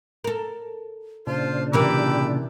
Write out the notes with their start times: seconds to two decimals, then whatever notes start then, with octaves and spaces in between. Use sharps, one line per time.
0.24 A4 A#4
1.27 A#2 C#3 D4 F4 C5
1.73 C3 E3 G4 A#4 B5 D6 E6